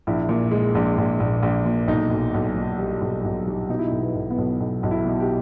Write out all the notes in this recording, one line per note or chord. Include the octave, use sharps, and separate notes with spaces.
A#1 E4
A#2
G#3
A#1
A#1
A#1
A#1
A#2
B1 D#4
B1
B1
A#2
G3
B1
B1
G3
B2 D#4
E4
D#4
B1
B3
B1
B3
B1
B1
B1
E4
B2
G4